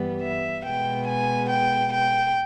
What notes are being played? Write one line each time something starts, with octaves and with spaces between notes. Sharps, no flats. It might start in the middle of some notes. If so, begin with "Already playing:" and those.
Already playing: G2 E3 G3 B3
E5
B2 G#3 B3 G5
G#5
G5
G5